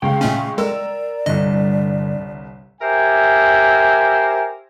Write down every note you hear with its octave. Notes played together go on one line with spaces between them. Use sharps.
C#2 G#3 F5 G5 C#6
A#2 A3 C#4
G#3 A#4 D5 E6
G1 C2 G2 D3 D#5
G4 A#4 C5 E5 G#5